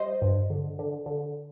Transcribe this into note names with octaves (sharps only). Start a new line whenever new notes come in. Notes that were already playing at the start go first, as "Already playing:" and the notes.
Already playing: G3 C5 D#5
G2
D3
D3
D3